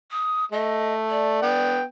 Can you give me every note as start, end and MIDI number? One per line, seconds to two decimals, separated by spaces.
0.11 0.44 87
0.52 1.37 57
0.52 0.93 75
1.09 1.74 74
1.42 1.83 59
1.42 1.83 79